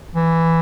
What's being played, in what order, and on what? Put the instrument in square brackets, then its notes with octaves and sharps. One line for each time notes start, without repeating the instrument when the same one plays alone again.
[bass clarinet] E3